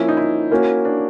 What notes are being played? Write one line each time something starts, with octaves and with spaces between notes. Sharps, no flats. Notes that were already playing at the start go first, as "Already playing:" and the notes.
Already playing: F3 A#3 C#4 E4
D#4
E4
A#3 C#4 F#4
D4